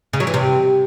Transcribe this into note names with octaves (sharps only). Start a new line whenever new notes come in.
C#3
F#3
E3
C3